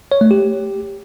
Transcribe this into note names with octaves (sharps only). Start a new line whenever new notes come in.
C#5
A3
G4